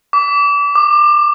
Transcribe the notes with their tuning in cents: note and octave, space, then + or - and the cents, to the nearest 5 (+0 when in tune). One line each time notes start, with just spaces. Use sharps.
D6 -30
D6 +25